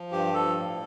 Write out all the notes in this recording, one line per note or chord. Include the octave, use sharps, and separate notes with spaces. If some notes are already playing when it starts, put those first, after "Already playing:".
Already playing: F3
G2 G4
F3 A4
A2